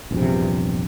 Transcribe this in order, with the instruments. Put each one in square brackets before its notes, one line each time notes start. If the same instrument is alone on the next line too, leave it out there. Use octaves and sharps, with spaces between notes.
[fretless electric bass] A#1 E2 G2 C3